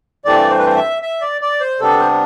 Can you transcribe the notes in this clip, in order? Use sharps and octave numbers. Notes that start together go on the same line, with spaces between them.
G2 E3 A3 C4 D5
C5
B4
C5
E5
E5
D5
D5
C5
C3 G3 B3 D4 A4
C5